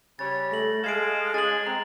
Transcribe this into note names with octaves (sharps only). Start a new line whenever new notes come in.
C#3 G3 C#5 B5 A6
A3 A#6 F#7
G#3 A4 D#5 F5 G#6 C7 D7
C#4 G#4 A6 F#7
C4 A#5